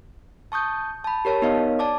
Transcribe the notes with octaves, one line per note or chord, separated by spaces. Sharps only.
A5 C#6 D#6 G6
A5 B5
G4 A#4 C#5 A5
B3 D#4 A#4 C#5 D#5 F5
D5 A5 D6